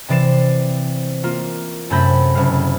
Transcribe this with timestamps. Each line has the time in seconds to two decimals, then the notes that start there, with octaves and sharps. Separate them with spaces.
0.08 C3 E3 D5 C7 E7
1.24 A#3 F4
1.90 F#2 C3 A3 B5 G6 A#6
2.35 F#1 F5